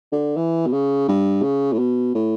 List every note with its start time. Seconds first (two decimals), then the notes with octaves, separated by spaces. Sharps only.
0.12 D3
0.37 E3
0.66 B2
0.72 C#3
1.08 G2
1.43 C#3
1.73 A2
1.78 B2
2.15 A2